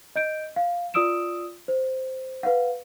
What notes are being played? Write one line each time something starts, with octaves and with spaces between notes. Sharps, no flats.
D#5 G6 D7
F5
F4 D5 D#6 E6 D7 E7
C5
B4 F5 F#5